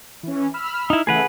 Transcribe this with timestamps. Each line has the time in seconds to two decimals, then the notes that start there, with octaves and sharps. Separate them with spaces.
0.23 E3 C#4
0.54 B5 E6 F6
0.90 D#4 E4
1.07 C#3 E3 A3 G#4 B4 F#5